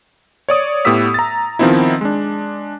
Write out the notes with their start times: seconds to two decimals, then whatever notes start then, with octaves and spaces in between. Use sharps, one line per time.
0.49 C#5 D5 D#6
0.85 A2 B3 G4 D#6 E6 B6
1.14 A#5 A6
1.59 D#3 F3 B3 C4 D#4 E4
2.01 G#3 D4